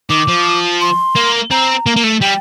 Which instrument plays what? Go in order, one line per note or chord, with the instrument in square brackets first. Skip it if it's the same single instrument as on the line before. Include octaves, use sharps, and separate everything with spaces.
[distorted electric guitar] D#3 [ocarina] D6
[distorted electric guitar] F3
[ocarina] C6
[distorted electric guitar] A#3
[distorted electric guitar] C4 [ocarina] A#5
[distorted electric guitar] A#3
A#3
A3
[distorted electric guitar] G3 [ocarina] G5